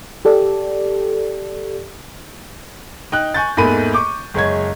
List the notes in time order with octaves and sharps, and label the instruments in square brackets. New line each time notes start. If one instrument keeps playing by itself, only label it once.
[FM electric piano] G4 A4 D5
[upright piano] D#4 G5 F#6
G#5 C#6 G6 A6
E2 G#2 A3 A#3 B5 D#7
C#6 D6 G6
F#1 G#3 C#5 G#6